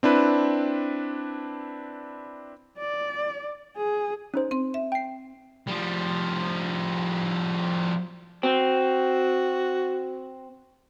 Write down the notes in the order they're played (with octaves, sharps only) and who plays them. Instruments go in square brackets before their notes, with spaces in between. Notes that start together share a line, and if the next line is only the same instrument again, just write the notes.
[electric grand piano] C4 D4 E4 B4
[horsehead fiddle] D5
G#4
[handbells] C#4 D#4 C5
[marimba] C4 C6
E5
[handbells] G5 C7
[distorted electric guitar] F3 G3
[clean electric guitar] C4 [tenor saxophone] F#4